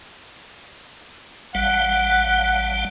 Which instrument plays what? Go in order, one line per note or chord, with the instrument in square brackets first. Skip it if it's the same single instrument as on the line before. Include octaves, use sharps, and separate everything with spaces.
[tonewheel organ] A1 G3 F5 [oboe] F#5